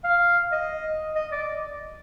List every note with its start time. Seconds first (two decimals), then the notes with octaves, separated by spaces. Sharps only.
0.04 F5
0.52 D#5
1.16 D#5
1.32 D5